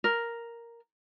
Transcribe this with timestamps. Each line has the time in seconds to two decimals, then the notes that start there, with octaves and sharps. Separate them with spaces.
0.04 A#4